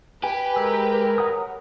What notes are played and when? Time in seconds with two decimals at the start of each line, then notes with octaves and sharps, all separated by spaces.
0.24 G4 B4 G#5
0.56 G#3 A#4 E6
1.18 C#5 F#5 D#6